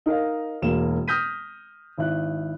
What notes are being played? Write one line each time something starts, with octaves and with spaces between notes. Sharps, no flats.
D#4 A#4 D#5 F5
E1 B2 A#3 E7
D#6 F6 G6 A#6 B6 D#7
G#1 E4 F#6